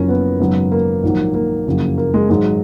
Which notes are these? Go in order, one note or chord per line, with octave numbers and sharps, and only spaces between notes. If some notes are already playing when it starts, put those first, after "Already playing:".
Already playing: F#1 F#2 F3 C#4 A#4
B3
G#1 F#2 C#3 F#3
A#3
A#1 G#2 D#3 F#3
A#3
F#1 F2 C#3 F#3
A#3
G#3
G#1 G#2 F#3 G#3